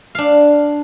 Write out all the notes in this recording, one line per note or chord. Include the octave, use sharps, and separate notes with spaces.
D4 F5